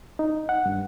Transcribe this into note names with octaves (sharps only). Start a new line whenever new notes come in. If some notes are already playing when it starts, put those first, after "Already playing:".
D#4
F#5
G2